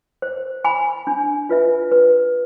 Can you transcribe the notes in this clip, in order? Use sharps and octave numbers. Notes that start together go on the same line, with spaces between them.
C5
G#5 B5
D4
F4 B4 E5
B4